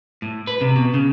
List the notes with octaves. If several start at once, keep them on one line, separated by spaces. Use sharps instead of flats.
A2
B4
C3
B2
C#3